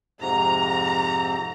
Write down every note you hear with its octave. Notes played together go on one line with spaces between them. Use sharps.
F2 G#2 C3 A#5